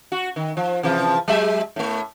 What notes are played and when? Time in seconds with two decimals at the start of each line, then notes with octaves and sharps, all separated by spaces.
0.12 F#4
0.36 D#3
0.57 F3
0.83 C3 E3 F3
1.28 F#3 G#3 E5
1.76 A2 A3